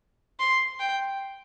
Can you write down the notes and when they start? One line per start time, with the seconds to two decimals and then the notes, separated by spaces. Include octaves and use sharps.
0.40 C6
0.80 G5